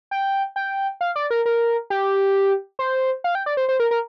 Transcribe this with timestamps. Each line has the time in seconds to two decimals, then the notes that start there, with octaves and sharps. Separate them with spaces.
0.11 G5
0.56 G5
1.01 F5
1.16 D5
1.30 A#4
1.46 A#4
1.90 G4
2.79 C5
3.24 F5
3.35 G5
3.46 D5
3.57 C5
3.69 C5
3.80 A#4
3.91 A#4